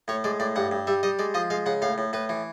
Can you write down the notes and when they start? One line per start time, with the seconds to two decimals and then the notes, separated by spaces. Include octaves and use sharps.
0.08 A2 C#5
0.24 G#3 D5
0.40 A2 D5
0.56 G2 F#5
0.71 G2
0.87 G3 E5
1.03 G3 D#5
1.19 G#3 D5
1.34 F3 D#5
1.50 G#3 F5
1.66 C#3 F#5
1.82 A2 F5
1.98 A2
2.13 A2 B4
2.29 E3